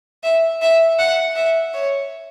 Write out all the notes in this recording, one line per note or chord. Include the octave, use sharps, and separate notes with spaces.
E5
E5
F#5
E5
C#5